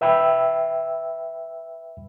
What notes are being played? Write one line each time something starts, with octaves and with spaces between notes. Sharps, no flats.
B4 E5 G5 B5 E6